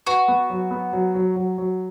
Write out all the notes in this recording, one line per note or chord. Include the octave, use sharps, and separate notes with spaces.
F#4 B4
B3
F#3
B3
F#3
F#3
F#3
F#3